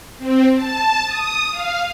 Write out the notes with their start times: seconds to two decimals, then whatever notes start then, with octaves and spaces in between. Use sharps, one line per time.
0.18 C4
0.55 A5
1.04 D#6
1.50 F5